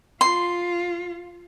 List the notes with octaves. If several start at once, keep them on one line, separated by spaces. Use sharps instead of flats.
F4 C6